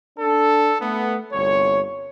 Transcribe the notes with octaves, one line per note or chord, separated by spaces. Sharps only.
D4 A4
A3 B3
G1 C2 C#5